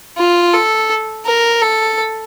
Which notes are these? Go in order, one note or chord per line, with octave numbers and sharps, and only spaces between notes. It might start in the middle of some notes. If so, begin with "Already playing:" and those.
F4
A4
A#4
A4